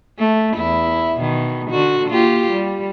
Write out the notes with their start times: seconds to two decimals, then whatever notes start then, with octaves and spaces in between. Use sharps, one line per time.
0.19 A3
0.56 E2 E4
1.18 B2 D#3
1.70 D3 F#4
2.09 A#3 F4 G4
2.52 G3